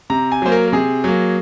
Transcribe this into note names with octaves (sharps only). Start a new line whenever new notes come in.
C3 A#5
G#5
F#3 A#3 C5
A#4
A#4
C3 G#4
F#3 A#3